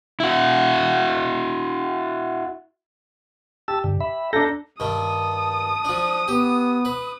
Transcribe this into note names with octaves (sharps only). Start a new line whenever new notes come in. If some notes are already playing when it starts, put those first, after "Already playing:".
E4 F#4
G4 A5 E6
G2 D3
E5 B5
D4 A4 A#5 G6 A#6
G2 D#3 A5 D#6
F3 D4
B3 G4
B4